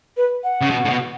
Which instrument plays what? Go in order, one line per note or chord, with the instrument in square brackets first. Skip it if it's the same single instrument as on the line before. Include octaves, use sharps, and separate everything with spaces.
[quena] B4
F#5
[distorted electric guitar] C#3
B2
A2
B2